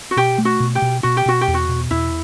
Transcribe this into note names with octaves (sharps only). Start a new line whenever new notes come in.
F#4
B2 G4
A3
F#4
B2
G4
B2
B2 F#4
G4
B2 F#4
G4
E2
F#4
B2
E2 E4